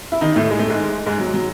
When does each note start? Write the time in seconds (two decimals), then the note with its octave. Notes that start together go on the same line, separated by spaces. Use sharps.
0.12 E4
0.21 D#3 D#4
0.36 A2 A3
0.50 G#3
0.59 A3
0.69 G#2 G#3
1.06 G#2 G#3
1.20 F#3
1.34 F#3